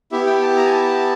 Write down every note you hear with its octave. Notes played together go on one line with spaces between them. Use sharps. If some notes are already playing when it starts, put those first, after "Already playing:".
B3 E4 G4 E5
G5
A5
A#5
G#5
A5